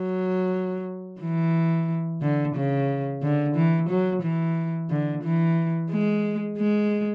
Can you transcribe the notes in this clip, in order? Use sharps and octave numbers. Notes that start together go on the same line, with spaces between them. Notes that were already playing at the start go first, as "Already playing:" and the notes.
Already playing: F#3
E3
D3
C#3
D3
E3
F#3
E3
D3
E3
G#3
G#3